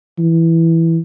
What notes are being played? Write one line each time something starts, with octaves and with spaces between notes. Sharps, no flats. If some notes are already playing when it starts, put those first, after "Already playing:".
E3